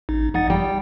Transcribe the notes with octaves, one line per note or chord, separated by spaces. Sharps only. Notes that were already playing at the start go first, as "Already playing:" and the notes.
A1 D#4
G#1 D#4 F#5 A6
G3 G5